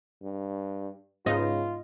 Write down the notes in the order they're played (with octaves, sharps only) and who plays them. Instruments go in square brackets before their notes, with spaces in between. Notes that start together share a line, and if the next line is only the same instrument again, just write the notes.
[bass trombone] G2
[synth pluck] G#2 B3 D#4 [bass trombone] C#3 [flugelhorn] F4 [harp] D#5